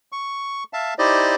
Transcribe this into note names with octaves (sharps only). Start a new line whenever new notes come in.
C#6
E5 F5 A5
D#4 E4 G4 C5 D5 D#5